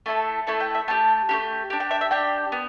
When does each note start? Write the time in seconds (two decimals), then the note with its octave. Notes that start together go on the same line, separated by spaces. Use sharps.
0.06 A3 E4 A4 A5
0.47 A3 E4 A4 A5
0.60 G5
0.75 E5
0.88 A3 E4 G4 A5
1.29 A3 E4 G4
1.70 D4 G4
1.80 G5
1.91 E5
2.01 E5
2.11 D4 G4 G5
2.52 B3